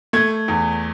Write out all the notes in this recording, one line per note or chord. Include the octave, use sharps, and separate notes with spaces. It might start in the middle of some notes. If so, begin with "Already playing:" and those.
A3 G#6
E2